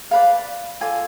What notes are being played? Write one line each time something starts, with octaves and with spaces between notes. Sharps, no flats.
G#4 B4 D5 F5
F4 A4 D5 G#5